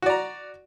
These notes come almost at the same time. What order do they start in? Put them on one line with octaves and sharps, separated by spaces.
F#4 D5 A#5